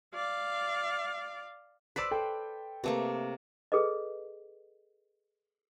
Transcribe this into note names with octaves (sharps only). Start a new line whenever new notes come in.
D5 F5
B4 C5 D5 E6 B6
A4 G5
C3 A3 A#3 B4
G#4 A4 B4 D#5